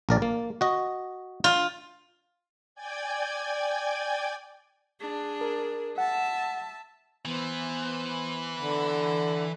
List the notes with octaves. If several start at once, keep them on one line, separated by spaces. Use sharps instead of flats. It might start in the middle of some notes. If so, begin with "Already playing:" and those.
A#1 A#4 D5
A#3
F#4 D#5
F4
D5 G5 G#5 G#6
D4 G#4
A#4
E5 F#5 A5
E3 B3 C5
D3 F#5 B5